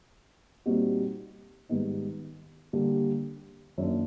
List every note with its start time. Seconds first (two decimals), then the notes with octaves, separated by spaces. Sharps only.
0.66 A#2 G3 C4 D#4 F#4
1.69 G#2 D#3 G3 B3 D#4
2.73 D3 G3 A#3
3.78 F#2 D#3 F#3 A#3 D4